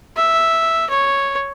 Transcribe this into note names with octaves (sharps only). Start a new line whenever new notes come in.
E5
C#5